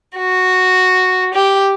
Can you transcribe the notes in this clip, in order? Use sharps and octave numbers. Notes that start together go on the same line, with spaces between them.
F#4
G4